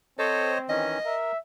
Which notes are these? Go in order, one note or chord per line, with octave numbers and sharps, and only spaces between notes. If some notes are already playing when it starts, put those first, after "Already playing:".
C4 A4 C5 C#5 D#5
D#3 E3 C#4 D#5
A#4 E5